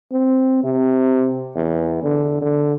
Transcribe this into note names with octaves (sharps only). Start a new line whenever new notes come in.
C4
C3
E2
D3
D3